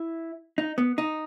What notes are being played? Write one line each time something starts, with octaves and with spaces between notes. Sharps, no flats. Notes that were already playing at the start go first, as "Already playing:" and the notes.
Already playing: E4
D#4
B3
D#4